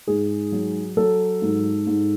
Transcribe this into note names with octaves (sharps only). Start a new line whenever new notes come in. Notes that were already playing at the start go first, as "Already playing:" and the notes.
G#2 G#4
F#3
F#3 A4
G#2
G#2